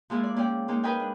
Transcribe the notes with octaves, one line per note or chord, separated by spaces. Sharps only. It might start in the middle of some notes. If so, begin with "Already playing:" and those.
F3 G#3 A#3 E4 F4
D5
A#3 C#4 D5 G5
G#3 A#3 D#4
A#4 B4 D#5 F5 G5 G#5
D4